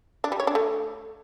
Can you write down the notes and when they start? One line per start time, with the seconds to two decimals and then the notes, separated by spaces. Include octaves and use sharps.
0.24 D4
0.32 G3
0.40 C#5
0.47 D4
0.55 A3